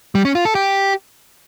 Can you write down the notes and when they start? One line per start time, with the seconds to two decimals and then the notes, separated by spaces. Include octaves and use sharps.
0.15 G3
0.25 C#4
0.35 F4
0.45 A4
0.55 G4